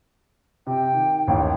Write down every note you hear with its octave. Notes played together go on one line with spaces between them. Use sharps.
C3 G5
D#3
A1 D#2